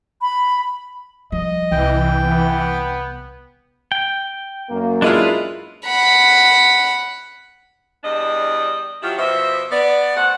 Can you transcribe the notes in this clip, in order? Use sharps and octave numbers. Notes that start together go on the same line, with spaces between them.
B5
F3 G3 D#5
C2 E3 G5
B3
G5
F#2 A#3
G#3 D4 E4 F4 B4 F5
F#5 B5
E2 G3 D4 D#5
F3 F#3 E4 F4 G4
B2 F3 C5 E5
B3 D5
A3 C5 F#5